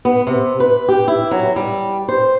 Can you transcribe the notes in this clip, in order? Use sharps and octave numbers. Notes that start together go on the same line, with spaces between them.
B3
C3
B4
G4
E4
F#3
G3
C5